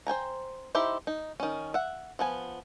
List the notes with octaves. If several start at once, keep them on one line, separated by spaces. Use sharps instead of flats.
C5 G5 G#5 A#5
D#4 E4 G4 C5 E5
D#4
D#3 C#4
E5 F#5
F3 B3 G#5